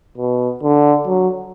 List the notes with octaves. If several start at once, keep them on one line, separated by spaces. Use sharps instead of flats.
B2
D3
F#3